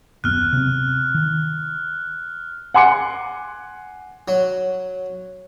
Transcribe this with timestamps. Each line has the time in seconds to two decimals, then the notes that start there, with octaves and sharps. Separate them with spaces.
0.24 D#1 F#2 B3 F6 F#6
0.53 C3 C4
1.14 D#3
2.74 F#5 G#5 C6 D6 C#7
4.28 F#3